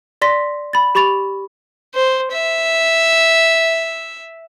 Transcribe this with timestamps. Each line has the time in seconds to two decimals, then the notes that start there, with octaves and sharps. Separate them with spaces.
0.22 D5 C6 A#6 B6
0.73 B5 A6
0.95 G4 B5 C#6 A6 F7
1.94 C5
2.32 E5